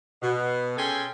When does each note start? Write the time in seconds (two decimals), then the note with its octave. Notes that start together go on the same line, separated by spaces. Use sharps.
0.22 B2
0.77 C#4 G#4 A4 G5 G#5 C6